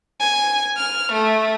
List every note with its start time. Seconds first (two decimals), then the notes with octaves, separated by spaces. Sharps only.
0.20 G#5
0.77 F6
1.13 A3